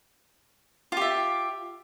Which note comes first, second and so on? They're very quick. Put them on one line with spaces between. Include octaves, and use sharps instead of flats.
F4 G4 E5